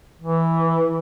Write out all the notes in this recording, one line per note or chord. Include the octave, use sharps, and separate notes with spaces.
E3